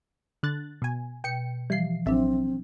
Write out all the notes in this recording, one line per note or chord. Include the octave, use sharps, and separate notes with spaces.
D3 F#6 A6
B2 G#5
B2 G5 C#7
E3 F3 G3 C7
A1 F#3 C4 D4 E5